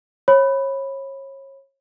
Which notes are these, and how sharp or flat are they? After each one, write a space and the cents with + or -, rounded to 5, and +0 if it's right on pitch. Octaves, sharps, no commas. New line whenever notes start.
C#5 -30 B5 +0